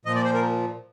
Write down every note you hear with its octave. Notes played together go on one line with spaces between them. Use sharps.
A#2 F3 D#5
D5
C5
A#4